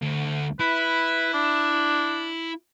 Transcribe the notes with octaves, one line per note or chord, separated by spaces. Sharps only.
D2
E4 B4
D4